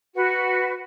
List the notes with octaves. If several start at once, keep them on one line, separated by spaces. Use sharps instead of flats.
F#4 B4